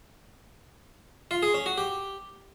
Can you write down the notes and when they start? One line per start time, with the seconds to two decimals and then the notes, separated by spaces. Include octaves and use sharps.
1.31 F4
1.43 G#4
1.54 C#4
1.66 F#4
1.78 G4